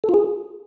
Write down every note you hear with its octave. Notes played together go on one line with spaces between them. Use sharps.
A4
F4
G#4